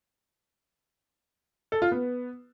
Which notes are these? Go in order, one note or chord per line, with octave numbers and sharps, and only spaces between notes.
A4
F4
B3